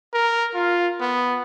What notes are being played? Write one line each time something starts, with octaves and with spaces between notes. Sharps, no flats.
A#4
F4
B3